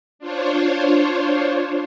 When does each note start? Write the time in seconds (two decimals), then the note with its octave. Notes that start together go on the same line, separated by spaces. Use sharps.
0.19 D4 F4 C5 C#5